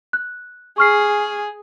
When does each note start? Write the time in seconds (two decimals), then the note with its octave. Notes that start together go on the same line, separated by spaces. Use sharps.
0.13 F#6
0.78 G#4 C#6 F6 C7